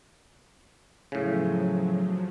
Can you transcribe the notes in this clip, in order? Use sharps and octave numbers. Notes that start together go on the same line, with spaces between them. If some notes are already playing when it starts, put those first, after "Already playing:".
A2 C#3 F3 F#3